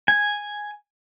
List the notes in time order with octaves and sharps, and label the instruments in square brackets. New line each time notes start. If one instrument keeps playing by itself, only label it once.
[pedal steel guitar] G#5